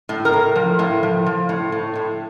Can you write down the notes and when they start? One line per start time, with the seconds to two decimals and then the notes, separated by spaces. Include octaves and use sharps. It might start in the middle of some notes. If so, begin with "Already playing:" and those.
0.09 A2
0.25 A#4
0.33 A2
0.56 F3
0.79 A2
1.03 F3
1.26 F3
1.49 A2
1.72 A2
1.96 A2